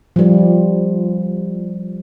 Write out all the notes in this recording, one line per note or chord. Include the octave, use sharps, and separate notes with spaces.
F3 G3